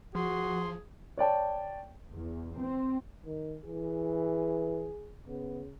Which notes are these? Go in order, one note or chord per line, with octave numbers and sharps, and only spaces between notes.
F3 F#4 G#4 C6
C#5 D5 G5 A5
E2
C4
D#3
E3 G#4
C#3 B3